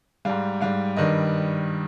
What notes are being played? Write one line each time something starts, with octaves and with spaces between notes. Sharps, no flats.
G#2 G3 F5
G#2 G3 F5
G2 D#3 G3 D#5